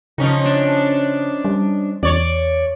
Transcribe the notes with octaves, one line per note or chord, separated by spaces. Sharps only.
C#3 F3 C#4 D#4
D4
G3
E2 C#5 D5